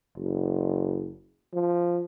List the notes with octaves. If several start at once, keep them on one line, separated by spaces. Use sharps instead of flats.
F#1
F3